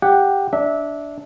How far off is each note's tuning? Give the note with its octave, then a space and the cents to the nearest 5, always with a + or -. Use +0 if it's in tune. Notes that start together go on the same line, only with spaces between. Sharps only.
G4 +5 F#5 +0
D4 -10 E5 -25